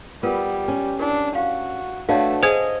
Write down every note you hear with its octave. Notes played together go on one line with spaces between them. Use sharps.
G3 B3 F4 A#4 B4
C#4
D4 E4 A#4
F#4 F5
A3 D4 F#4 B4 C#5 D#5 F5
G#4 C5 D#5 F#5 G#5 D#6 G#6